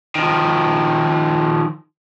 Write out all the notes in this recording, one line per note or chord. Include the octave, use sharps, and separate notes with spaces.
D#3 F3